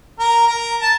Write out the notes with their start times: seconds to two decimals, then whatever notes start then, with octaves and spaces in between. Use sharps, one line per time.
0.19 A#4
0.47 A#4
0.81 A5